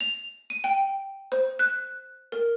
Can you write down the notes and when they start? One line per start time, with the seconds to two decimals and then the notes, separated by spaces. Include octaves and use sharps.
0.01 F7
0.50 D#7
0.64 G5
1.32 C5
1.59 F#6
2.32 A#4